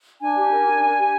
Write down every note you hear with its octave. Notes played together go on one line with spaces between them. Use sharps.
D4 G#5
G4
A#4
D4
D4
G4